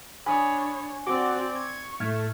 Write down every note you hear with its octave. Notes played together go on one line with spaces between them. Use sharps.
D4 C#5 G#5 B5 D#6
C4 F#4 D5 D6
C#6 G#6
A2 A3 F6 G#6